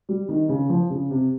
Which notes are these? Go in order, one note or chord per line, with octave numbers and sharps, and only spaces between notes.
G3
D#3
C#3
F3
C#3
C3